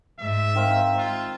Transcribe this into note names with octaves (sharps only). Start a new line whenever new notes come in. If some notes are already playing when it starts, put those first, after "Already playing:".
G#2 E5
D#3 C4 F5
F4